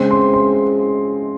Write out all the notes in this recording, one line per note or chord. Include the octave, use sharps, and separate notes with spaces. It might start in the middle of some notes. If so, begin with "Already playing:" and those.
Already playing: C#3 G#3 C4
C6
C6